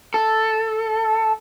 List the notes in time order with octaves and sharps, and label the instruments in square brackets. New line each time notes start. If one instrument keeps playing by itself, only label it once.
[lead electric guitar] A4